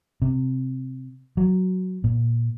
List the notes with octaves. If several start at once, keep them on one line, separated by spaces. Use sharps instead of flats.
C3
F#3
A#2